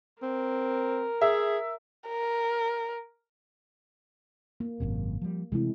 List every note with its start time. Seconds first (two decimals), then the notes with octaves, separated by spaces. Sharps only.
0.22 C4 A#4
1.21 G#4 E5
2.08 A#4
4.60 A#3
4.80 G#1 F#2 C3
5.22 F3 G3
5.52 C3 E3 G#3 A3 C4 E4